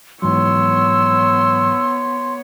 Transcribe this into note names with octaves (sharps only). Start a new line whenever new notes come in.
G#2 E3 F#3 B3 C#5 C6 E6